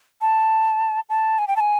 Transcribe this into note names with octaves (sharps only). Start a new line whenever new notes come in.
A5
A5
G#5
G5
A5
G#5